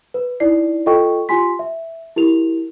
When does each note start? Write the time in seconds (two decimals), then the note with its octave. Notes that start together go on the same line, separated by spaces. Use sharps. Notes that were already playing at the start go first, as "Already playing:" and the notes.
0.14 B4
0.40 D#4 E4 D5 C7
0.86 F4 A4 D#5 G5 C#6
1.29 F4 G4 G#5 C6 B6
1.59 E5
2.16 E4 G4 A#4 F7